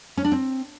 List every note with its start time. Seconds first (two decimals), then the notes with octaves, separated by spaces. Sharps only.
0.17 C#4
0.25 D4
0.32 C4